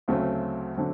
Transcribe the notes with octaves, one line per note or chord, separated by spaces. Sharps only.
D2 C#3 F#3 A3 C4
D3 F#3 A3 C4